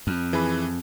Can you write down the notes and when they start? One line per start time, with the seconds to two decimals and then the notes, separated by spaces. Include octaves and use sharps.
0.07 F2
0.33 E3 G#4 B4